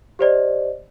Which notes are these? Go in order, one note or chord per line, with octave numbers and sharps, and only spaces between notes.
G4 C5 D5 D#5